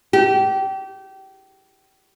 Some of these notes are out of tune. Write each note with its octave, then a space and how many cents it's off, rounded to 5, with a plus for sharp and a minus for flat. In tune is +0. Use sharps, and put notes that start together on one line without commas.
G4 -25